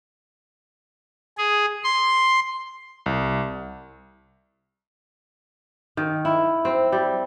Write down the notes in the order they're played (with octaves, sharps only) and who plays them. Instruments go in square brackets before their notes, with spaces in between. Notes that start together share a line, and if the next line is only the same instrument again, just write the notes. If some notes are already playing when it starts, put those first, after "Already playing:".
[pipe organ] G#4
C6
[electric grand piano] C2
[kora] D#3
E4
C4
G3